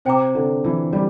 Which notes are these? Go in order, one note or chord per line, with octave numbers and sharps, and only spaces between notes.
C3 C5 G5 A#5 D6
D3
E3
G3